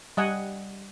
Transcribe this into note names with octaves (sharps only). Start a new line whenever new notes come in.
G3 D#5 F#5 G#5